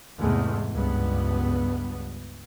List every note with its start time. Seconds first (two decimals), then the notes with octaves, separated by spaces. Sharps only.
0.18 E2 G#2 C3 G#3 A3
0.73 C#2 G2 B3